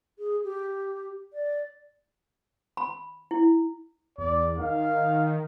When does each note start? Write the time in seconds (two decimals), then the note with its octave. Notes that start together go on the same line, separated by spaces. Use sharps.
0.19 G#4
0.44 G4
1.33 D5
2.77 B5
3.31 E4
4.18 E2 D5
4.58 D#3 F5